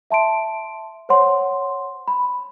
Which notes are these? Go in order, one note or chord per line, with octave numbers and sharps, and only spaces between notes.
E5 A5 C6 D7
C5 C#5 F#5 C6
B5